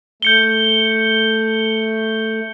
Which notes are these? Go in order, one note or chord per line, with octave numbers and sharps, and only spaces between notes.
A3 G6 C#7 G7